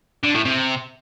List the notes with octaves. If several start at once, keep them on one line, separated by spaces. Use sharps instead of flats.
D3
A2
C3